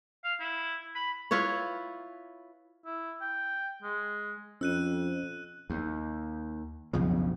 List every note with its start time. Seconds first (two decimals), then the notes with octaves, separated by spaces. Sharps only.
0.24 F5
0.40 E4
0.95 B5
1.31 E4 F4 B4 C#5
2.85 E4
3.21 G5
3.82 G#3
4.61 F2 C#4 E6 F#6 D#7
5.70 D#2
6.93 B1 F2 C#3 F3